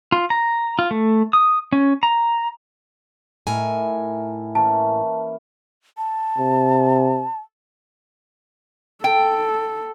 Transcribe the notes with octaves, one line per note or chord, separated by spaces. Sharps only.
F4
A#5
F4
A3
D#6
C#4
A#5
A2 D#4 E4 A#4 G#5
E3 A#3 C#4 A5
A5
C3
A4 G5